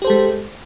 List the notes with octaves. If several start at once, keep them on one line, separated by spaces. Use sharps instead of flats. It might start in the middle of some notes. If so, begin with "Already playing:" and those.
G#3 G4 A4 C5